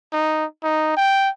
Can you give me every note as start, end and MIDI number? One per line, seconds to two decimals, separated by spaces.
0.13 0.45 63
0.63 0.95 63
0.97 1.29 79